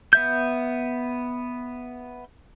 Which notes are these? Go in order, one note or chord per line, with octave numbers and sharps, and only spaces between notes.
B3 E5 G6